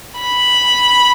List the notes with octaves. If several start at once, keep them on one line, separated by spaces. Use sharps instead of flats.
B5